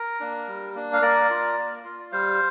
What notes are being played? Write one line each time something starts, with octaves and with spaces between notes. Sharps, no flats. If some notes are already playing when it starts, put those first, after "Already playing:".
Already playing: A#4
A#3 D4
G3
A#3 D4
F5
A#3 A#4 D5
F4
A#3
F4
G3 C5 F5